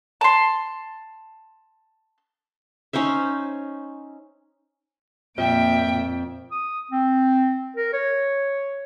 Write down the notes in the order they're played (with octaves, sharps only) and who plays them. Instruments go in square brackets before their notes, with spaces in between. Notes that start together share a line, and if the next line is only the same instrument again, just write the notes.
[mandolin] A5 C6
[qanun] C#4 D#4 C5 E5
[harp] F2 [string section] A#2 [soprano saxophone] E5 [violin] G5 D7
[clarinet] D#6
C4
A#4
C#5